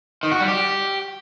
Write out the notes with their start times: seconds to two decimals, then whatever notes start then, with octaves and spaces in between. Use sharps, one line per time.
0.23 D#3
0.31 F#4
0.40 G3
0.48 G4